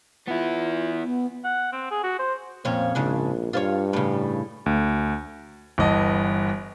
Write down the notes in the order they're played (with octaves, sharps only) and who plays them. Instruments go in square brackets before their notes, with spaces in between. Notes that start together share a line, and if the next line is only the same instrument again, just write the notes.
[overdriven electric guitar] B3 E4 [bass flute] F4
[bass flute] B3
[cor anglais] F#5
C4
G#4
F#4
C5
[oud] F2 A#2 C#4 [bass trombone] C4
[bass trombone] A#1 [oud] G#2 C#3 D4
[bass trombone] G2 [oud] F4 C5 C#5
[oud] A2 C#3
[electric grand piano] D2
[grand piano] G1 E3 D#5 A5